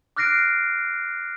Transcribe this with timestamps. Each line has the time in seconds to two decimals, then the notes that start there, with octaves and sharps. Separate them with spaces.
0.17 D6 F6 F#6 A#6 C7 D7